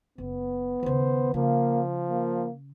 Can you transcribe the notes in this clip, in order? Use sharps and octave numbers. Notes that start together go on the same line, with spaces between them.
F#1 B3
D#2 C#3 C5
C#3 F3 A#3
A#3